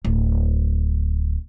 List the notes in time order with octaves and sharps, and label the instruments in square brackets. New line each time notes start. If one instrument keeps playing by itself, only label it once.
[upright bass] D1